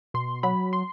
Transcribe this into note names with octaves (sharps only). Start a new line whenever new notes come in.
B2 C6
F#3 B5
C6